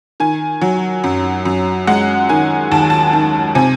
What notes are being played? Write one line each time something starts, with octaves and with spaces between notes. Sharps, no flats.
D#3 G#5
F#3
F#2
F#2
G#3 F#5
D#3 G#5
D#2 A5
A5
D#3
C3 G#5